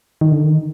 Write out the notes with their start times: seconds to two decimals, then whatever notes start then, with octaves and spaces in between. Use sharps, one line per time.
0.21 D#3
0.32 D3
0.44 D#3